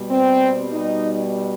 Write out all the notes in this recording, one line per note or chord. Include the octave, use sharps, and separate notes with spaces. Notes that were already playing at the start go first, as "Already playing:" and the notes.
Already playing: B2 G3
C4
D#4